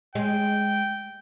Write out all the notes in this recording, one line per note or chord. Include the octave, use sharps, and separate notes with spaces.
G#3 G5